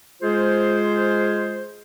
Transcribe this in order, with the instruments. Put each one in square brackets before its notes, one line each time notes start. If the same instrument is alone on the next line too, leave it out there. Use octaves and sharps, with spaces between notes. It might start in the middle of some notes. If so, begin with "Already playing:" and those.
[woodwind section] G#3 F4 G#4 C5